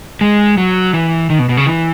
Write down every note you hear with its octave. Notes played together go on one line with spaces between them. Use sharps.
G#3
F#3
E3
D#3
B2
B2
C#3
E3